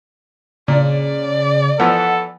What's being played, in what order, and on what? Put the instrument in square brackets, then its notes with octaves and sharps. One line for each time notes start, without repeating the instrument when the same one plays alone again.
[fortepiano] A#2 D4 [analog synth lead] C#3 [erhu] D5
[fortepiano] E3 F3 B3 [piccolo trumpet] A4 [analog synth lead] F#5